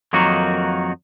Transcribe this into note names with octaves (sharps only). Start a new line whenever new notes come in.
F2 D#3 F#3 A#3 D#4 F#4